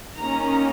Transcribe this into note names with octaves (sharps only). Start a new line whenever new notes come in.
D#3 A#3 C#4 A#5